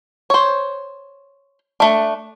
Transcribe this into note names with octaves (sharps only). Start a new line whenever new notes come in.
C5 C#5
A3 D4